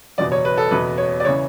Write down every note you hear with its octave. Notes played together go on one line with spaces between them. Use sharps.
F#1 E2 B2 D5
C#5
B4
A4
F#1 E2 B2 B4
C#5
D5
C#3 E3 C#5